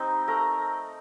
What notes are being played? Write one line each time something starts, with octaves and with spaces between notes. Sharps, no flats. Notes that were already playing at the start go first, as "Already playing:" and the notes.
Already playing: G3 C4 D#4
A3 A#4 A#5